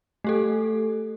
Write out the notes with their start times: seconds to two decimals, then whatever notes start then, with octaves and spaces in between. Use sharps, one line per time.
0.24 A3 G4 A4